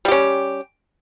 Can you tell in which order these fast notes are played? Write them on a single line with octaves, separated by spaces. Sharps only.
G3 G4 C#4